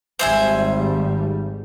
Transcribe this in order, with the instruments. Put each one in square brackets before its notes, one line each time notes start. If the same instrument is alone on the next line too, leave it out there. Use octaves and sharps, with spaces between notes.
[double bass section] G#1 G3 [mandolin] C5 E5 G#5